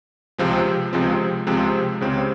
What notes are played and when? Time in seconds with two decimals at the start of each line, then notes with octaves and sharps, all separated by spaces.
0.38 C#2 C3 F3 G#3 C4
0.93 C#2 C3 F3 G#3 C4
1.47 C#2 C3 F3 G#3 C4
2.01 C#2 C#3 G#3 C4 G4